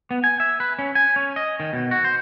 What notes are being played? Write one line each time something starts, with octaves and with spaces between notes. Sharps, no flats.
B3
G#5
E5
B4
C#4
G#5
C#4
D#5
D#3
B2
F#4
C5